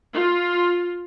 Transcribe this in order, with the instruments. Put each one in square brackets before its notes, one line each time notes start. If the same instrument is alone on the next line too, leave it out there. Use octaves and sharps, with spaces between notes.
[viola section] F4